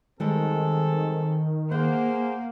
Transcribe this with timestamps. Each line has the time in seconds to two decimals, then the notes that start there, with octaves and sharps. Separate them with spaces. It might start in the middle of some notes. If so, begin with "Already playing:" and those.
0.20 D#3 G3 G#3 C4 G#4 A4
1.72 A#3 G#4 C5 F#5